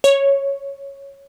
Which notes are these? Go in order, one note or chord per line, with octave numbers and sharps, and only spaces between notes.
C#5